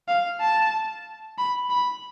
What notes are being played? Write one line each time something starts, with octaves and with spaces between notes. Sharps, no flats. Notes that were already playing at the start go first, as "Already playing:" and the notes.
F5
A5
B5
B5